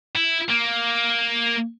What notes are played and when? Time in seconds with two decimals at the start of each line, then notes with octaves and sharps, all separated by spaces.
0.16 E4
0.50 A#3